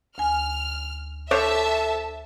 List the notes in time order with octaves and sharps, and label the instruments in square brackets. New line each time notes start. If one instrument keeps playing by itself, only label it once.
[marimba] D2 G#5 [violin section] F6
[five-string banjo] D4 C5 C#5 [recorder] A4 [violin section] E5 A5